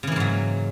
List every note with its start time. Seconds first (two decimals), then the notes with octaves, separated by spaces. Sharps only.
0.03 C#3
0.07 E3
0.12 A#3
0.16 G#2
0.20 F#3